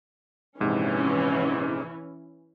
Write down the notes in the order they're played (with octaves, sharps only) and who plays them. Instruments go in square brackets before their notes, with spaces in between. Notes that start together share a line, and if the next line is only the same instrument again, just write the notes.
[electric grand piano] A#1 G#2 C3 [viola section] E3 C#4